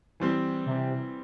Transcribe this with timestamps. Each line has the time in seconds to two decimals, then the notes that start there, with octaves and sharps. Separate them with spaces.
0.20 E3 G3 C4
0.66 C3